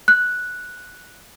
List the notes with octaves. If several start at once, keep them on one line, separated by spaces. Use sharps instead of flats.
F#6